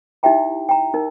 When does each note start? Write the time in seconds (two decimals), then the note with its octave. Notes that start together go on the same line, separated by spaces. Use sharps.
0.23 D#4 E4 G4 E5 G5 A#5
0.69 G5 A#5
0.94 D#4 A#4